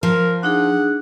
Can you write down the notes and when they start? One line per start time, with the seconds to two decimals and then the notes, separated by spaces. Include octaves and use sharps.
0.03 F3 A#4
0.43 D4 D#4 G#4 F#5